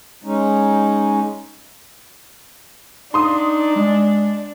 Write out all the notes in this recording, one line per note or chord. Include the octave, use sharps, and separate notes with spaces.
G#3 C#4 D#4
D4 D#4 C6 D#6
G#3